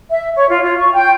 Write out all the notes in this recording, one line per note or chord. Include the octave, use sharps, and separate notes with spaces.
E5
C#5
F4
F4
C#6
G5